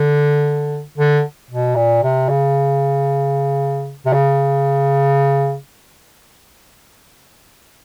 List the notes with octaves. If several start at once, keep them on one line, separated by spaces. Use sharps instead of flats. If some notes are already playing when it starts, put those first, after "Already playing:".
Already playing: D3
D3
B2
A#2
C3
C#3
C3
C#3